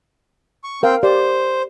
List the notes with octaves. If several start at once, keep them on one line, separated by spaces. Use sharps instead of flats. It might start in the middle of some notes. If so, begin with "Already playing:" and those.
C#6
C4 A#4 F5 G5
G4 C5 D5